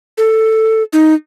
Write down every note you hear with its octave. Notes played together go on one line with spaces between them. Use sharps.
A4
D#4